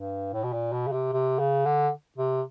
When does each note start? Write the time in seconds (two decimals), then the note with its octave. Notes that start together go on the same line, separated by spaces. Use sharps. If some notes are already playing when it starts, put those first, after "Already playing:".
Already playing: G2
0.33 A2
0.44 B2
0.53 A#2
0.73 B2
0.88 C#3
0.92 C3
1.13 C3
1.39 C#3
1.65 D3
2.18 C3